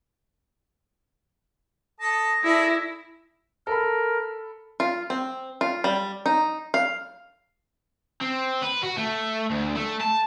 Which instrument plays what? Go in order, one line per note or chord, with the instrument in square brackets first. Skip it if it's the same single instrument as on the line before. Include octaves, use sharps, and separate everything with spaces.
[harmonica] A4 A5 D#6 [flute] A#6
[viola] E4 [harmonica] G#4 A4 D5
[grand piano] A4 B5 [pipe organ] A#4
[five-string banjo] F4
C4
F4
G3
D#4
F5
[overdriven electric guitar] C4
B4
F#4
A3
D2
A3
A5